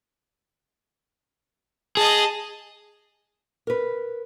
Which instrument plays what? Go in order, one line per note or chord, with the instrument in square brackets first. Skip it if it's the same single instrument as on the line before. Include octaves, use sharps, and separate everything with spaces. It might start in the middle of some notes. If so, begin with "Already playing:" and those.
[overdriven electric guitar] G#4 [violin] D#5 A5
[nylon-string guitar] A#4 B4